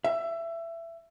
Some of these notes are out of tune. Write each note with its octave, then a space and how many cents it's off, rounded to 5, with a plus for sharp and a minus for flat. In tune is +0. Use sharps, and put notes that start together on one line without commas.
E5 +20